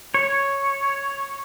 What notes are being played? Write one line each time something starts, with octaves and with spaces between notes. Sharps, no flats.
C#5